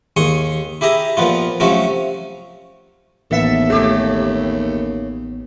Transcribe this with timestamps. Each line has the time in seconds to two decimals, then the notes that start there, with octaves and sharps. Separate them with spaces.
0.17 D#2 G#4 C6 C#6
0.81 E4 G4 G#4 E5 A#5
1.17 A#2 F3 B3 F4
1.60 C3 F3 F#3 A3 C#4
3.31 A1 D#2 B3 A4 E5
3.70 C#3 A3 G4